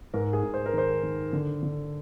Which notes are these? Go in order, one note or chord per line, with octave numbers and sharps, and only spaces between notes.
G#2 A#4
G#4
G#2
C5
A#4
D#3 C5
D#3
D3
D3